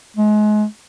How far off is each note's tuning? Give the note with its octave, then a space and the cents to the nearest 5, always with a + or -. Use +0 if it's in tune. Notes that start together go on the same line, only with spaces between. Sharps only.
G#3 +30